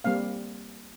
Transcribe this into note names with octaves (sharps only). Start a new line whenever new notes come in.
G3 A#3 C4 F5